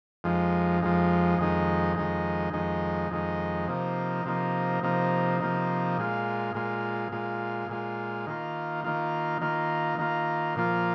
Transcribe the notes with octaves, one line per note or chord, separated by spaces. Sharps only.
F2 F3 G#3 D#4
F2 F3 G#3 D#4
F2 D#3 G#3 D#4
F2 D#3 G#3 D#4
F2 D#3 G#3 D#4
F2 D#3 G#3 D#4
C3 F3 A#3 D#4
C3 F3 A#3 D#4
C3 F3 A#3 D#4
C3 F3 A#3 D#4
A#2 G#3 F4
A#2 G#3 F4
A#2 G#3 F4
A#2 G#3 F4
D#3 A#3 F4
D#3 A#3 F4
D#3 A#3 F4
D#3 A#3 F4
A#2 F3 A#3 F4